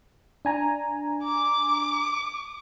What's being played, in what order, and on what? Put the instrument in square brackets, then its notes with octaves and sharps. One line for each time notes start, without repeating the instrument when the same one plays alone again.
[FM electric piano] D4 G#5 A#5
[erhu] D6